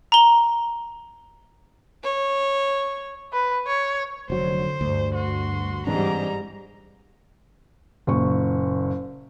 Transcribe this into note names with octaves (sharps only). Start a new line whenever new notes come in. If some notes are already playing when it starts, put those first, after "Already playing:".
A#5 G7
C#5
B4
C#5
F1 D3 F#3 C5
D2 G2
F#4 C6
G#2 E3 G3 C4 D4 A#5
F#1 A#2 C#6